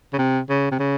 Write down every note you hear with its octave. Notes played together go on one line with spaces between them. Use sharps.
C#3
C3
C#3
C3
C#3